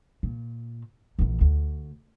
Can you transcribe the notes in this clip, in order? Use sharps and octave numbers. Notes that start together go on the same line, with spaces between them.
A#2
A#1 E3
D2